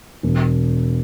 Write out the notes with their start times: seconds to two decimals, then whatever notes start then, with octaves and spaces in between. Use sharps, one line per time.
0.23 E1